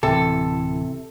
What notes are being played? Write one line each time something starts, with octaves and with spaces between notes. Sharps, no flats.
D1 C3 E3 A4